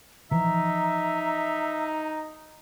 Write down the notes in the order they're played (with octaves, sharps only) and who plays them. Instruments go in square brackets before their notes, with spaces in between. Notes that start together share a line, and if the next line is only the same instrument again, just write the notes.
[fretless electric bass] E3 F3 [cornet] D#4 [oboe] E5 [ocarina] A#5